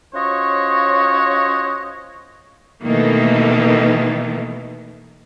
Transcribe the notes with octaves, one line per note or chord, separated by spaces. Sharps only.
C#4 F4 F#4 C5 C#5 D#5
B2 D#3 E3 A3 A#3